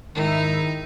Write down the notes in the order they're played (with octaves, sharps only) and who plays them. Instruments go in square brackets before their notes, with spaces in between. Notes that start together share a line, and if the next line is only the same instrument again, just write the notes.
[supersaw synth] G#2 E4 E5 [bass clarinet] D#3 [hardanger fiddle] D#4